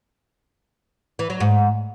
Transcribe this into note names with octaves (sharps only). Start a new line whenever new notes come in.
E3
F#3
G#2